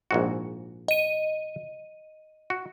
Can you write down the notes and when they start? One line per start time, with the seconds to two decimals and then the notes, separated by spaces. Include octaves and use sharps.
0.11 A#1 G#2 F#4
0.88 D#5 D#7
2.50 F#4